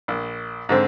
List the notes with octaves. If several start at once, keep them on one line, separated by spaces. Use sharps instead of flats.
A#1
G#2 D3 C4